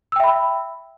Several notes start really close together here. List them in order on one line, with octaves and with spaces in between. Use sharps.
E6 G5 E5 B5